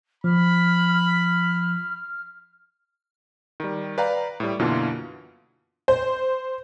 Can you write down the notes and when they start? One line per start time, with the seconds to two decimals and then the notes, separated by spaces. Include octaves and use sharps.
0.24 F3 B5 F6
3.60 D#3 G3
3.98 B4 D5 F5 G5 A#5
4.40 A2 G3
4.59 F#2 B2 D3 E3 A#3 F4
5.88 C5